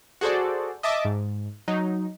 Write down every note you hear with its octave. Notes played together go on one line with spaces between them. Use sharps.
F#4 G#4 A4 C5 D5
D#5 E5 A5 D6
G#2
F#3 D#4